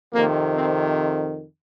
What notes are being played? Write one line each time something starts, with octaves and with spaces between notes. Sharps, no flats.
F2 C3 D#3 A#3
C4